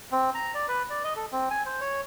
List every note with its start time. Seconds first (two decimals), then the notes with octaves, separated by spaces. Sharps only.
0.12 C4
0.34 A#5
0.55 D5
0.68 B4
0.90 D5
1.04 D#5
1.16 A4
1.32 C4
1.51 G#5
1.65 C5
1.81 C#5